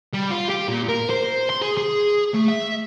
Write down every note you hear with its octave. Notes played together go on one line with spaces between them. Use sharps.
G3
F4
G4
A#2
A#4
C5
C6
G#4
G#4
A3
E5